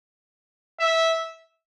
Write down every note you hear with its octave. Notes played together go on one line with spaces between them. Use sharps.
E5